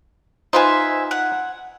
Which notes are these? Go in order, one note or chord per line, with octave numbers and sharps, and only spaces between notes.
D#4 F4 B4 C5 E5 G#5
F#5